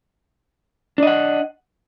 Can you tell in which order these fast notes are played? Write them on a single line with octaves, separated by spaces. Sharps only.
D4 D#5 F#5